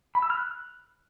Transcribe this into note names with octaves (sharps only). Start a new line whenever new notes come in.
B5
E6
F6
F#6